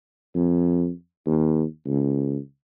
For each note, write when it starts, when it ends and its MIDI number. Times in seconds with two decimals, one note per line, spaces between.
0.35 0.90 41
1.26 1.64 39
1.86 2.38 37